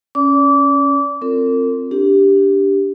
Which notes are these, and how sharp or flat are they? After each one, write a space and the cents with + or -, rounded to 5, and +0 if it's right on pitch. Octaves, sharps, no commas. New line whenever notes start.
C#4 +0 D5 -30 D6 -25
C4 +15 F4 -5 A#4 -45
D4 -10 G4 +0